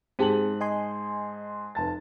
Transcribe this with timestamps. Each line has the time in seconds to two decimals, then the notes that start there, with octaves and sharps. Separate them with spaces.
0.19 G#2 C4 G4 G#4 A5 F#7
0.61 D#5 G#5 C6
1.75 F1 A5 A6